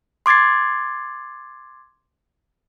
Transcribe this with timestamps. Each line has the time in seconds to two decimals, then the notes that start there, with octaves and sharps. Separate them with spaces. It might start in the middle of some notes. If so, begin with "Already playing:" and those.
0.26 C6 D6 G#6 A6 C7